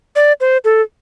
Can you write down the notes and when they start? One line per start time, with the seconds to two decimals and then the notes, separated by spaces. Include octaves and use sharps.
0.16 D5
0.41 C5
0.65 A4